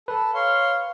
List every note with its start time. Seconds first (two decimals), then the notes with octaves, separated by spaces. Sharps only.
0.08 A4 B4
0.34 C#5 F5 C6